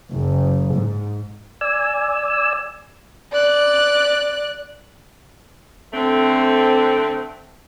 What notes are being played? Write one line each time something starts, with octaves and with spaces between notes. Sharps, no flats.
F#1
G#2
D5 G#5 E6
D5 F#6
D3 A3 C4